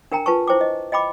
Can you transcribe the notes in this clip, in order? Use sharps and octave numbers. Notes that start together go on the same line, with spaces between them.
D4 A#4 G5 G#5 A#5
F4 B4 G#5 A5 C#6
E4 C5 G5 D6
D#5
D#5 G5 B5 D6